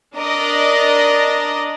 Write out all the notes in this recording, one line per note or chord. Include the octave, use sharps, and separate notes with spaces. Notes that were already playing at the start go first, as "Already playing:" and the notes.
D4 A#4 D5 D#5